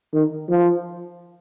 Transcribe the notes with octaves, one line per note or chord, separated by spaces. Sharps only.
D#3
F3